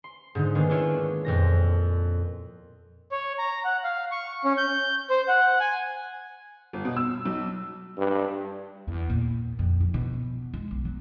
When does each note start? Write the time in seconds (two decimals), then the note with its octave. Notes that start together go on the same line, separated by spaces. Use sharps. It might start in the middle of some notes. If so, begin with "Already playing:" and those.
0.04 C6
0.35 G#2 D3 D#4
0.55 D#3 G#3 A#3 B3 D4
0.69 G#3 D4 E4 F4 C#5 E5
1.25 F2 A#2 A#6
3.11 C#5
3.39 A#5
3.64 F#5
3.84 F5
4.12 C#6
4.45 C#4
4.57 G6
5.10 C5
5.28 F#5
5.60 G#5
6.73 G1
6.85 B2
6.97 E6
7.25 B1
7.98 G2
8.88 E2
9.10 A#2
9.59 F2
9.81 F3
9.94 B2
10.54 G#3
10.71 B1
10.85 F#3